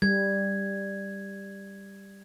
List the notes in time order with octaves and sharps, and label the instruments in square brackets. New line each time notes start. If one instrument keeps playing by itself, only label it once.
[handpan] G3 [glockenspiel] G#6